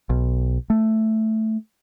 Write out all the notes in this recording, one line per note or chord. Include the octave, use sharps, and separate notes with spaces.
B1
A3